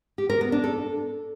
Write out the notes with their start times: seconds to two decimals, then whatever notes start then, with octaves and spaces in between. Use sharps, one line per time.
0.18 G4
0.30 A#4
0.41 B3
0.52 D4
0.64 A4